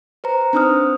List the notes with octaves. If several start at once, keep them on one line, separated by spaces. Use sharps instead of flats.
B4 C5 A#5
C4 D4 D#4 C5 D#6 F6